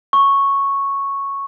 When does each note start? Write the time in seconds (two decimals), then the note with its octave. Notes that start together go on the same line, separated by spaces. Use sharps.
0.13 C#6